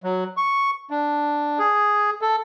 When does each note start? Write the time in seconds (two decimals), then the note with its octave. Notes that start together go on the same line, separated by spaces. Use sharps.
0.04 F#3
0.37 C#6
0.90 D4
1.59 G#4
2.21 A4